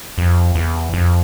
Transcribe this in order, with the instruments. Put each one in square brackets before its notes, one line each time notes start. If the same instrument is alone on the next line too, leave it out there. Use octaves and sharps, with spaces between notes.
[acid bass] F2
E2
F2